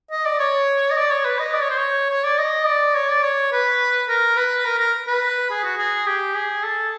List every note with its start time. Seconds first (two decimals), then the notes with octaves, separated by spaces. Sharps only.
0.12 D#5
0.26 D5
0.40 C#5
0.91 D#5
0.97 D5
1.11 C#5
1.25 B4
1.39 D#5
1.54 D5
1.61 C#5
1.70 C5
1.78 C#5
2.10 C#5
2.24 D5
2.38 D#5
2.66 D5
2.95 C#5
3.09 D5
3.23 C#5
3.52 B4
4.09 A#4
4.37 B4
4.65 A#4
4.79 A#4
5.07 B4
5.51 G#4
5.64 F#4
5.78 G#4
6.07 G4
6.35 G#4
6.64 A4